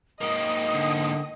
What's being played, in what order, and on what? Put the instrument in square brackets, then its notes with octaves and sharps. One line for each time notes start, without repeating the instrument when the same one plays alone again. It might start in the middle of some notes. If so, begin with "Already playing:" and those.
[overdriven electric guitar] G#2 A#3 [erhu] D#5 [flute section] G5 D#6
[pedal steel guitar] D3